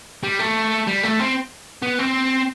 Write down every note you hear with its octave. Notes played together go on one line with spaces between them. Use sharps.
G3
A3
G3
A3
C4
B3
C4